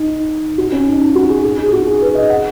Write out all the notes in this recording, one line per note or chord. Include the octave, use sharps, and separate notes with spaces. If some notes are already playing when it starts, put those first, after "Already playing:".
Already playing: D#4
F#4
C#4
D#4
D#4
F#4
G#4
G#4
D#4
G#4
F#4
G#4
B4
D#5
F#5